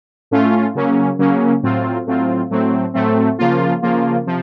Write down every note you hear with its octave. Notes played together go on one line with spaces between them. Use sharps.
A2 A3 C#4 F4
C#3 F#3 A#3 C#4
C#3 F#3 A#3 C#4
A2 F#3 C4 F4
A2 F#3 C4 F4
A2 F#3 A3 C4
A2 F#3 A3 C4
C#3 F3 A#3 F4
C#3 F3 A#3 F4
C3 F3